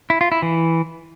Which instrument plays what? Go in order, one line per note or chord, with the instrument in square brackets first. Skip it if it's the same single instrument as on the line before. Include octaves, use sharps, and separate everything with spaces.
[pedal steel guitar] E4
F4
E4
E3